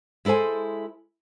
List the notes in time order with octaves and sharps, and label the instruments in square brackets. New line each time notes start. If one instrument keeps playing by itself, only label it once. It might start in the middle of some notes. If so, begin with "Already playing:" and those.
[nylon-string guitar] G#3 E4 A4 C5 G#5